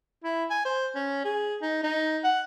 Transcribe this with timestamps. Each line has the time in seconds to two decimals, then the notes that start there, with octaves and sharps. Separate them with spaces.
0.24 E4
0.50 G#5
0.65 C5
0.95 C#4
1.25 G#4
1.62 D#4
1.83 D#4
2.24 F#5